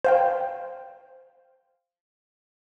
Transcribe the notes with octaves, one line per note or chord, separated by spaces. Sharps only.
C5 F5 G5